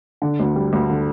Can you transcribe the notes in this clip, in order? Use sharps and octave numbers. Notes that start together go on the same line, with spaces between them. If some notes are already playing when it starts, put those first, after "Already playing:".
D3
D2
G3
D2
D3